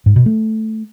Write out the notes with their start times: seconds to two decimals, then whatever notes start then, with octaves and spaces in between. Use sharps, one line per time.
0.06 G#2
0.16 B2
0.26 A3